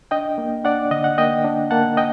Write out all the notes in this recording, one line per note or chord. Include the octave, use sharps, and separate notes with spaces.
D4 D#5 G5
A#3
D4 D5 F#5
D3 D#5
F#5
A#3 D#5 G5
D4
A#3 F#5 A5
D#5 G5